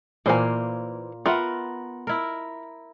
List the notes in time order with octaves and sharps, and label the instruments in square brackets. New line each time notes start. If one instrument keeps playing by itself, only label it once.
[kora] A#2 A#3 [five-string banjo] E3 C5 G#5
[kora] B3 A#4 [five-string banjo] F4 E5 F#5
[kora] E4 A#4